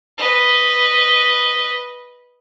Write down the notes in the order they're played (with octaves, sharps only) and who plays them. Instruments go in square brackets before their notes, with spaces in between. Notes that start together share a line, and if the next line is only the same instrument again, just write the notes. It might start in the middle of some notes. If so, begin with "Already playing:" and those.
[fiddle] B4 D#5